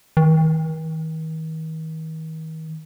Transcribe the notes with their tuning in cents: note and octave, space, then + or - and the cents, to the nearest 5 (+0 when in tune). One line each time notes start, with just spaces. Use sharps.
D#3 +40